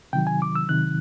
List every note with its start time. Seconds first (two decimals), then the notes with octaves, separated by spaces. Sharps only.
0.13 C3 D#3 F#3 G5
0.27 G#5
0.42 D6
0.55 E6
0.69 C3 D#3 F#3 F#6